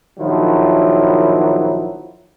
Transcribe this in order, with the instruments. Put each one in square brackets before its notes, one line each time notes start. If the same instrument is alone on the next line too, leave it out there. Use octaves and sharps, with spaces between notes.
[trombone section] A#1 D#3 F3 F#3 E4